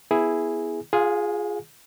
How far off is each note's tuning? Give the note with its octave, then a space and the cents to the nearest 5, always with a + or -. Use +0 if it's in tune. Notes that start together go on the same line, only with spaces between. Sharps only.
B3 +0 E4 +0 G#4 +0
F4 +0 G#4 +0 F5 +45